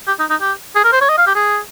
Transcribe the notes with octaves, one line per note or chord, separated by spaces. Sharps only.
G4
D#4
D#4
G4
G#4
A#4
C5
C#5
D#5
F5
G4
G#4